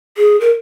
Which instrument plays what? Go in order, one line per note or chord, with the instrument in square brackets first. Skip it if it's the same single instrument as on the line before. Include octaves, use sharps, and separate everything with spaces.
[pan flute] G#4
A#4